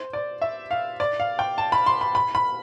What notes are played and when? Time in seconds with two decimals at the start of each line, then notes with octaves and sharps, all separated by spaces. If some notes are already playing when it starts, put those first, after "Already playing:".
Already playing: C5
0.13 D5
0.42 E5
0.71 F5
1.00 D5
1.20 F5
1.39 G5
1.58 A5
1.72 B5
1.86 C6
2.01 B5
2.15 B5
2.35 B5